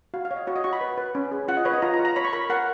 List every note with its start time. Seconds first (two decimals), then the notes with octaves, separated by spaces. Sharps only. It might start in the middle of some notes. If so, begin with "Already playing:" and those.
0.14 F#4 F5
0.25 F5
0.31 C#5
0.36 D#5
0.47 F#4 C#5
0.56 D#5
0.64 F#4 C#6
0.73 B5
0.81 B4
0.98 B4
1.15 C#4
1.32 G#4
1.48 F4 F#5
1.57 D#5
1.65 B4 C#5
1.74 D#5
1.82 F4 A#5
1.94 A#5
1.99 F4
2.05 A#5
2.16 C#5 B5
2.25 C#6
2.33 A#4 B5
2.50 A#4 F#5